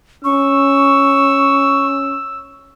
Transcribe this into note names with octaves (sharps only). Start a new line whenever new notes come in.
C#4 C#6 E6